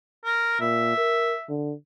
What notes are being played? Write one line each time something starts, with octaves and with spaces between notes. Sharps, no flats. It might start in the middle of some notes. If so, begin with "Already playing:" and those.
A#4
A#2 E5
A#4
D3